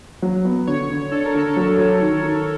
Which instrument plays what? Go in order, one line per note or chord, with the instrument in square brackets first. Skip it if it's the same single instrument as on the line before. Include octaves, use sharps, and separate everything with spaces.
[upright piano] F#3
B3
[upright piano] D3 [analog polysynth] C#5
[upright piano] D3
[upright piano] D4 [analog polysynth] A4
[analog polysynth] A#4
[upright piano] D3 [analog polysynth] A4
[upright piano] F#3
F#3
D#3
D#3